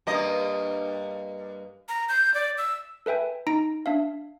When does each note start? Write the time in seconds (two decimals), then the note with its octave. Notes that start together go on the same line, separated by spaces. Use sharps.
0.07 G2 A#3 D#5
1.89 A#5
2.09 G6
2.34 D5
2.58 E6
3.06 A4 B4 E5 G5 G#5
3.47 D#4 A#5 A#6 D7
3.86 D4 E5 F5